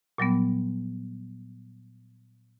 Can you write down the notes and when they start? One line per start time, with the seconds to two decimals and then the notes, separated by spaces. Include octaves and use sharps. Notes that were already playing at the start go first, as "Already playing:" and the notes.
0.18 A#2 F#3 G3 B3